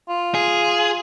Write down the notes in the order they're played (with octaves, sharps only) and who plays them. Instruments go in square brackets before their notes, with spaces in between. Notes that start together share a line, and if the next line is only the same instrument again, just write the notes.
[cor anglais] F4
[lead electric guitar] G#4